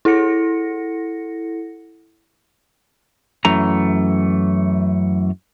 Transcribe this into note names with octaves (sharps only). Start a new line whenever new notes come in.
E4 A4 F#5 A#6 C#7
F#2 E3 A3 A#5